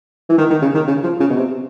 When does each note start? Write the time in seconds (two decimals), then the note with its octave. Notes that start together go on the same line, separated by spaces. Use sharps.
0.29 E3
0.38 D#3
0.50 D#3
0.62 C#3
0.74 D#3
0.87 C#3
1.03 F3
1.20 C#3
1.30 B2
1.36 C3